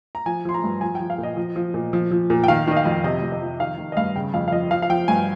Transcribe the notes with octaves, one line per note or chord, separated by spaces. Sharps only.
A#5
F3 G#5
F3 C6
A#5
G2
F3 G#5
F3 G5
F5
A#2
D#5
F3
F3
A#2
F3
F3
A#2
G5
D#3 F5
D#3 D#5
F5
F2
C3 D#5
F2
D#5
F3
D#3 F5
D#3
D#5
G2 F5
C#3 G5
F2 F5
F5
F3 D#5
F3 F5
F5
F3 G5
G2 G#5